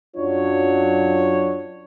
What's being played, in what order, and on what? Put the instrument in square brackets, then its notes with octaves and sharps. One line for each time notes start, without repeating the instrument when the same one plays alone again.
[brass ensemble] F#2 F#3 D4 F4 C#5